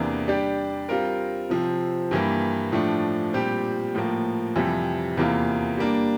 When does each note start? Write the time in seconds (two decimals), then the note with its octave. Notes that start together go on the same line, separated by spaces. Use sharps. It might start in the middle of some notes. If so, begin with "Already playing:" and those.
Already playing: E2 C3 E3 A#3 D4
0.28 G3 D4 G4 D5
0.89 G3 C4 F4 A#4
1.50 C3 F3 C4
2.11 G2 E3 A#3
2.72 A2 F3 A3 D4
3.33 A#2 G3 C4 G4
3.95 A2 F3 A#3
4.56 F2 C3 E3 G3
5.17 E2 C3 E3 A#3 F4
5.78 G3 A#3 D4